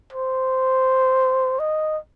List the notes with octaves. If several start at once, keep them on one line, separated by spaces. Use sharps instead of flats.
C5
D#5